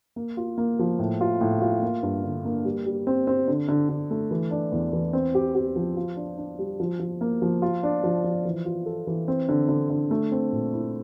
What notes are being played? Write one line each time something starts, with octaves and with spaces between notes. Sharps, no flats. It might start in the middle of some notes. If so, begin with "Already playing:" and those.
A#3
F4
A#3
F3
A2
F4
A2
F4
A#3
G2
D3
A#3
G3
G3
C4
C4
D3
D3
D3
A3
E3
D4
E2
E3
C4
G4
G4
F3
F4
D4
D4
G3
F3
F3
A#3
F3
F4
D4
F3
F3
E3
F4
A4
E3
C4
D3
D3
D3
A3
C4
A#2
E4